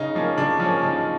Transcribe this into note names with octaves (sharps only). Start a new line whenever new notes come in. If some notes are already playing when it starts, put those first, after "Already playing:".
Already playing: C#3 D#4
F3 A#3 C#4
C#3 D4
F3 A#3 C#4
C#3 D#4